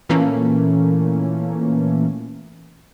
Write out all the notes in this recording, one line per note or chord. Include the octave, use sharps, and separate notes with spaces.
A#2 E3 A3 A#3 C#4